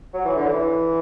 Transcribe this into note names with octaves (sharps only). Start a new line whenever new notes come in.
F#3
E3
D3
E3